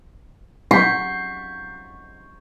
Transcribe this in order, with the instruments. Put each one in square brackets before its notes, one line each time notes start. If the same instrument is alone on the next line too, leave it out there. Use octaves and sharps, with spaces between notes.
[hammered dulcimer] C#6 [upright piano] G6 B6 C7